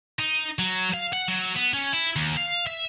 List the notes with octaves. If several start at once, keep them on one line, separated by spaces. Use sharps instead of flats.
D#4
F#3
F5
F#5
F#3
B3
C#4
E4
D#2
F5
E5